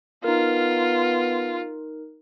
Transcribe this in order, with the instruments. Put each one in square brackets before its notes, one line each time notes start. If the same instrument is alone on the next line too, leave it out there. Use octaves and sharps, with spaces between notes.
[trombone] B3 [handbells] D#4 A#4 [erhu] F4